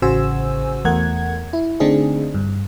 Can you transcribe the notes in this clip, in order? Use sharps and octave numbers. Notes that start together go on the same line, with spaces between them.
A1 C#3 F#4 C5 G#5 E6
E2 A3 A#4 F#5 G#6
E4
D3 A3 C4 D4 D#4 G#4
G2